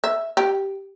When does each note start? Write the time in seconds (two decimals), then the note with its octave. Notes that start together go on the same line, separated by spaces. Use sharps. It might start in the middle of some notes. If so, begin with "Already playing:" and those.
0.04 E5
0.37 G4